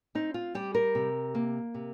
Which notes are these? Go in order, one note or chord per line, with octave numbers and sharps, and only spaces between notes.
C4 D#4
F4
G3 G4
A#4
C3
A#3
C3